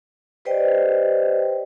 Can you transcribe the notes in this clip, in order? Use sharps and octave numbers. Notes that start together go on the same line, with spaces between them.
G4 B4 C5 D5 D#5 G5